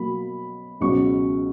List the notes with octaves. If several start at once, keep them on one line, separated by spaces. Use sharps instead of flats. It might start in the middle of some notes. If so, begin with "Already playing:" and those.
Already playing: B2 F#3 A#3 B5
C#2 B2 F#3 C#6